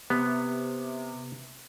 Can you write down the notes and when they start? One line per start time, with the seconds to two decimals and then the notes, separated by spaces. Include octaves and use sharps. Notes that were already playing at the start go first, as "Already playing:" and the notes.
0.10 C3 B3